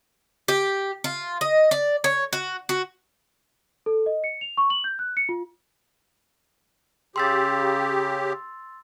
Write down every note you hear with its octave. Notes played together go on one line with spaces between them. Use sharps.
G4
F4
D#5
D5
C#5
F#4
F#4
A4
D#5
C#7
F7
C#6
F#7
G6
F#6
C#7
F4
C#3 G4 C6 E6 A6